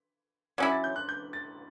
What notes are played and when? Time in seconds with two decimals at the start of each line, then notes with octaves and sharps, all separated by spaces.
0.58 F#3 C#4 E4 D6
0.72 A6
0.84 G6
0.96 F#6
1.09 G6
1.33 A6